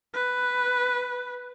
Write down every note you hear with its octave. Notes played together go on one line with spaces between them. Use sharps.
B4